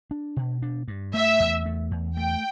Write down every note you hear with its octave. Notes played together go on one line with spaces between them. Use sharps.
D4
B2
D4
G2
A3 E5
E2
A3
E2
A3 G5